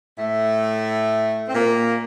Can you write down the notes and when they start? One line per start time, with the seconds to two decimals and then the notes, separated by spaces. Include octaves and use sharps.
0.18 A2 A3
1.48 C4
1.55 A#2 A#3